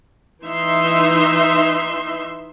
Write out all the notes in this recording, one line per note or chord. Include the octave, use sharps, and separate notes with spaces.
E3 D#4 E5 C6